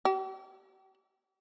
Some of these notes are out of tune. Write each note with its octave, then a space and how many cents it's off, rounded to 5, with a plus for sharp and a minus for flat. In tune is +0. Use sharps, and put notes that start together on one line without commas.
G4 -45